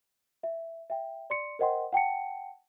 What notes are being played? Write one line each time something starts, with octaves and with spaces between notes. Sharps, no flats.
E5
E5 G5
D5 C6 C#7
A#4 C5 D#5 F#5 G5 C6
F#5 G5 A5 C#7